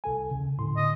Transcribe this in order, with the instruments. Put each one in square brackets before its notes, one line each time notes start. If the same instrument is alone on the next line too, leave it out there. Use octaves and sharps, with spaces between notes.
[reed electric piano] C2 A4 G#5
D#2 C#3
[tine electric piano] A2 D3 [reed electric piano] C6
[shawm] D#5